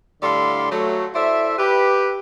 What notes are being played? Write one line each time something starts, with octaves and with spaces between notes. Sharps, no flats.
A2 D3 G3 A4 F5 C6
F#3 A3
E4 A4 C5 D5 E5
G4 B4